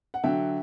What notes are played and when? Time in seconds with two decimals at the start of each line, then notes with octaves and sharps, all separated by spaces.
0.14 F#5
0.24 D3 F#3 E5 G5